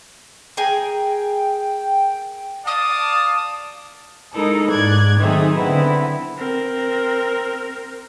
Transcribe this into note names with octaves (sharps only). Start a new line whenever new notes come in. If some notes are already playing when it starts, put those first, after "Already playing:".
G#4 A#4 G5 G#5
D5 F5 A5 D#6
G#3 D#4 E4 A4 A#4
G#2 D5 F#6 G#6
D#3 F#3 A3 C4 D#4 G#4
D3 B3 C4 E4
C4 A#4